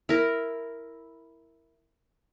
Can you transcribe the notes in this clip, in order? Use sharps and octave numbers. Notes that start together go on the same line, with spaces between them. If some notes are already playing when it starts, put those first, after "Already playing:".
E4 A#4